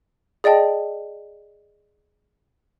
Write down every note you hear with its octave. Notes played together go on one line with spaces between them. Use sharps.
G#4 D5 D#5 G5 A5